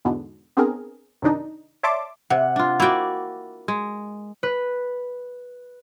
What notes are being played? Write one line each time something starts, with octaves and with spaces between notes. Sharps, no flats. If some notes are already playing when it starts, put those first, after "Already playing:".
E2 G#2 B2 D3
B3 C4 D4 G#4 A#4
F#2 C3 D#3 D4 D#4
C#5 D5 E5 A5 C6 D6
C3 F#5
D4 F4
A#3 E4 F#4 D5 G5
G#3
B4